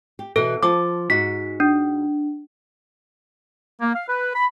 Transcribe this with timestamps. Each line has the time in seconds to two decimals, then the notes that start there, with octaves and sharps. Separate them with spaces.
0.19 G4
0.36 B2 E3 A4
0.63 F3 A5 D6
1.10 G#2 D#4 F#4 B6
1.60 D4
3.81 A#3
3.94 F5
4.08 B4
4.34 B5